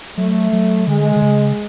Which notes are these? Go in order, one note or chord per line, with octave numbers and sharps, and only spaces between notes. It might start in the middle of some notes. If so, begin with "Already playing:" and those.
F#3 A3
F#3
D3 G#3
D3
C#3